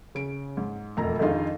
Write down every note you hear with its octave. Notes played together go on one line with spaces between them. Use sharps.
C#3 D7
G#2
E1 F2 A3 A#5
F2 D3 D#3 G#3 D#4 F4